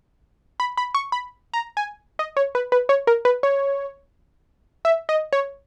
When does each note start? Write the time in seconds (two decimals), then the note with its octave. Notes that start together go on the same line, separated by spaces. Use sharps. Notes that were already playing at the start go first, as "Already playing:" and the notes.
0.60 B5
0.77 B5
0.95 C#6
1.12 B5
1.54 A#5
1.77 G#5
2.19 D#5
2.37 C#5
2.55 B4
2.72 B4
2.89 C#5
3.07 A#4
3.25 B4
3.43 C#5
4.85 E5
5.09 D#5
5.33 C#5